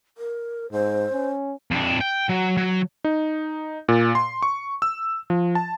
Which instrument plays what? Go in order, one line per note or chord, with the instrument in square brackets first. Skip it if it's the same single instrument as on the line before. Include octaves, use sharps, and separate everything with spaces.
[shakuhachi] A#4
[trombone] G#2 [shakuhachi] C5
[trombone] C#4
[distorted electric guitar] F2 D4
G5
F#3
F#3
[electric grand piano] D#4
A#2
C6
C#6
E6
F3
A5